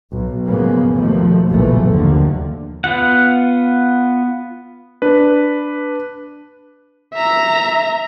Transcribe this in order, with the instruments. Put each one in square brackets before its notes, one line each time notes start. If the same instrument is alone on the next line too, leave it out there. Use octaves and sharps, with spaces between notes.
[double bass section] B1
G#2 C#3 F3 A#3 B3
D#2 B2 F3 A3 A#3
F#1 B1 A#2 E3 A3
D#2 D3 F3
[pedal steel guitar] B3 F4 F#5
[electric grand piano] D4 B4
[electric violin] E5 A#5